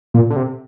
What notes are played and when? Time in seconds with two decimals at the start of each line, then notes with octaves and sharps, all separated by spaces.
0.14 A#2
0.30 D3
0.36 C3